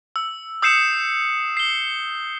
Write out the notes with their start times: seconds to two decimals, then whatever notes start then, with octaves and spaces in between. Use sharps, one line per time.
0.16 E6
0.62 D#6 E6 G6 C7 C#7 E7
1.57 C7 G7